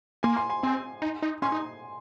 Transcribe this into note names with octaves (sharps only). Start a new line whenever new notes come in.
A#3 G#5 C6
G#5 C6
G#5 C6
C4 G#5 C6
D#4
D#4
C#4 G#5 C6
D#4